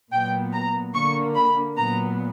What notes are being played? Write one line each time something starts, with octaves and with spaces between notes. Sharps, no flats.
A#2 F#3 B3 G5
A#5
D3 A#3 C#6
B5
A#2 F#3 B3 A#5